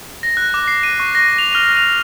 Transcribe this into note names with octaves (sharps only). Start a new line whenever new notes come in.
A#6
F#6
D6
C7
D#7
C#6
A#6
F7
F6
F7